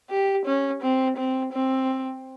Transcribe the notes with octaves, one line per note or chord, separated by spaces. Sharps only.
G4
C#4
C4
C4
C4